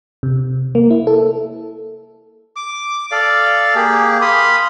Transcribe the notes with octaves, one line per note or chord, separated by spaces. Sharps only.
C3
A#3
E4
A4
D6
A4 D5 F5
A#3 G4 G#4
F5 B5 C6 D#6